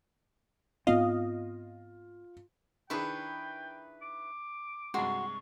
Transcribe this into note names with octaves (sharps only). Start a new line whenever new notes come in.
G#2 B3 C4 F4 D#5 F5
D#3 D4 E4 G#4 B4 G5 C#6
D6
G2 C3 G#3 F#4 C6 C#6